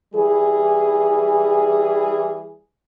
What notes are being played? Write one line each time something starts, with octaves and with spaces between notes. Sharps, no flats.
E3 G3 G#4